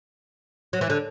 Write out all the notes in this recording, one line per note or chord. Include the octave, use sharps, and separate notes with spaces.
F#3
E3
D3